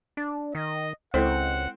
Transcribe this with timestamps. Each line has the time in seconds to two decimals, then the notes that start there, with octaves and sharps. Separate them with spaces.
0.17 D4
0.55 D#3 D#5
1.14 C#2 G#3 C4 E4 A4 F#5